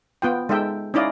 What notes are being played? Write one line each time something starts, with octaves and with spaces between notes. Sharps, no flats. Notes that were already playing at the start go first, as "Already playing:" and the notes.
B3 F4 G5
G#3 D#4 A4 E5 G5
C#4 D#4 E4 D5 D#5 F5